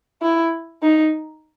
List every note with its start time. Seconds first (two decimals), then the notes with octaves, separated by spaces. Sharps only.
0.22 E4
0.82 D#4